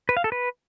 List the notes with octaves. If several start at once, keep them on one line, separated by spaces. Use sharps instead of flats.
B4
F5
A4
B4